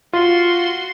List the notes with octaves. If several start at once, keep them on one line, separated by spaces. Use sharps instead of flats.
F4 F#4 C6